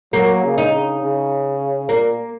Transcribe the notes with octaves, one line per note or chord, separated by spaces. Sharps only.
F#3 A#3
C#3
D#4
C#3
C#3
A#2 A#3